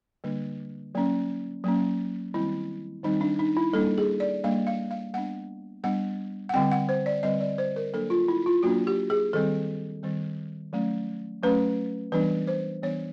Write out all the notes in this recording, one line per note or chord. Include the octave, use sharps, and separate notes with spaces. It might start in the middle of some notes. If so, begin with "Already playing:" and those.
D3 G3 A#3 D4
F#3 A#3 C#4
F#3 A#3 C#4
D#3 G3 C4 E4
D#3 G3 C4 D#4
D4
D#4
E4
G3 A#3 D4 A4
G#4
D5
G3 A#3 D4 F5
F5
F5
G3 B3 D4 F#5
G3 B3 D4 F#5
F#5
D3 G3 C4 G5
F#5
C5
D5
D3 G3 C4 D#5
D5
C5
A#4
F#3 A#3 D4 A4
F4
E4
F4
F#3 A#3 D4 F#4
G4
G#4
D#3 G3 C4 A4
D#3 G3 C4
F#3 A3 C#4
F#3 A3 C#4 B4
E3 G3 B3 D4 B4
C5
E3 G3 B3 D4 C#5